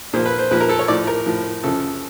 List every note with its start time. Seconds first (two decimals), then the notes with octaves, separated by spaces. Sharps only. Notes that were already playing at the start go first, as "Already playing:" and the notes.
0.13 A#2 F3 C5
0.25 B4
0.38 C5
0.51 A#2 F3 B4
0.60 A#4
0.69 A4
0.79 C#5
0.88 A2 F3 D5
1.07 A#4
1.26 A2 F3
1.63 F#2 C#3 F3 A4